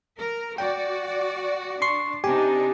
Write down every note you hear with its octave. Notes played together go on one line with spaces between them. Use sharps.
A#4
F#4 D5 G5
D4 C6 C#6 C7
C3 D4 D#4 G4 G#5